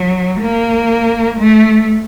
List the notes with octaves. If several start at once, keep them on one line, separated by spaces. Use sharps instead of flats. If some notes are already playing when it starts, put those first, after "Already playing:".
Already playing: F#3
A#3
A3